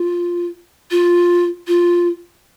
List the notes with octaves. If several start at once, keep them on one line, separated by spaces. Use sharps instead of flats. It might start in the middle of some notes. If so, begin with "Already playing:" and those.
Already playing: F4
F4
F4